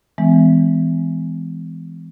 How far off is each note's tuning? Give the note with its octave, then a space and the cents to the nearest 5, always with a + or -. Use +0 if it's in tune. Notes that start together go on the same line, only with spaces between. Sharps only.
E3 +0 G#3 +0 B3 +45